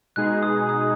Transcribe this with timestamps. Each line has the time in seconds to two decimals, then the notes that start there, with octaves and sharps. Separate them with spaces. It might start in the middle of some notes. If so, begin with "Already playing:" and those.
0.16 B2 G#3 D#4 G#4 F#6
0.43 D#6
0.69 D#6